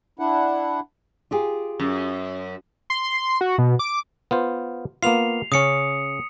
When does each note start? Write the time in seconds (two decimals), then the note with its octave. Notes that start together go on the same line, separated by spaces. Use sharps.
0.19 D4 E4 F#5
1.31 F4 G4 G#4
1.80 F#2
2.90 C6
3.41 F#4
3.58 B2
3.79 D6
4.31 B3 F4 C5
5.03 A#3 B3 F4 C7 F7
5.52 C#3 C#4 D#6 C#7